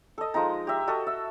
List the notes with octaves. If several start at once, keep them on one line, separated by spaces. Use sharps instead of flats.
A4 D#5
F3 G#3 D#4 A#5
G4 E5
F#4 A4 D#5
E5